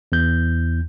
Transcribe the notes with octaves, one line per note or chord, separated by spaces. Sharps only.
E2 G6